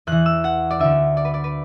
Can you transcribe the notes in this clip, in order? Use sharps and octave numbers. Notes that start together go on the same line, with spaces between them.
E2 E3 F#6
E6
F#5
D5
D2 D3 E5
D5
B4
D5
B4